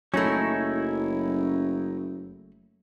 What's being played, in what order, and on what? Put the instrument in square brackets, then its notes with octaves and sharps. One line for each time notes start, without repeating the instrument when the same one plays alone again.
[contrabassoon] F#1 [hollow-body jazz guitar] F#3 A3 [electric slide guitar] C#4 D#4 E4